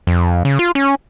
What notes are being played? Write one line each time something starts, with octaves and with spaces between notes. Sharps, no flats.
F2
C#3
F4
C#4